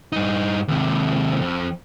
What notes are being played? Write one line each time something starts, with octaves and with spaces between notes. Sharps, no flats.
G2 D#4
D#2 C3
F2